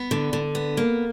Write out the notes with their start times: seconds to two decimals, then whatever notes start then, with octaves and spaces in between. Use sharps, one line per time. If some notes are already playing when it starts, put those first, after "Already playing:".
Already playing: B3
0.11 D3
0.33 D3
0.55 B3
0.77 A#3